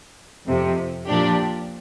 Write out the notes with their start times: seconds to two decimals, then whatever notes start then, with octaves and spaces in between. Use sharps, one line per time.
0.46 F2 C3 F3
1.06 A#2 F3 D4 G4